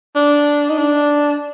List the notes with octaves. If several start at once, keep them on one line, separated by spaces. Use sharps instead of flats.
D4
D#4
D4